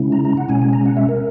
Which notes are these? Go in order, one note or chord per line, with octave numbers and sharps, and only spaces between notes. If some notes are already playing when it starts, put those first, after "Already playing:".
Already playing: C#3 G#3 C#4 E4
A#5
A#5
F#5
B2 G#3 C#4 G#5
G#5
A#5
F#5
E5
A#4